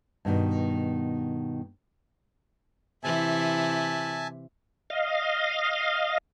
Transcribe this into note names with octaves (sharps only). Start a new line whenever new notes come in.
G2 B2 D#3
C3 E3 E4 E5 G#5 A5
D#5 F5